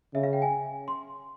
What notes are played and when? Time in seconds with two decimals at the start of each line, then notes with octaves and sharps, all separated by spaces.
0.14 C#3 E5
0.23 F5
0.33 G5
0.42 G#5
0.88 C6